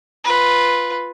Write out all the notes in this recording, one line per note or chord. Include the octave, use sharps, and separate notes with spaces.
F4 B4